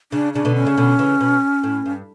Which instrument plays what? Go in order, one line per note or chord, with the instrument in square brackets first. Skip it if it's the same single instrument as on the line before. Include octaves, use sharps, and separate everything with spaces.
[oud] C#3 [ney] D4
[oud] C#3 [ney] D4
[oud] B2 D3
[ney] C#4
[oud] C#3
B2 D3
C#3 E3
B2
A2
G2